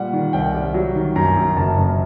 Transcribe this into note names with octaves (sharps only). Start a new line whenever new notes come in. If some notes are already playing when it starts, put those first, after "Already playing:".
Already playing: A#2 G3 F#5
D#3
C2 G5
G3
F#3
D#3
F#2 A#5
F#2
F#1 A5
F#1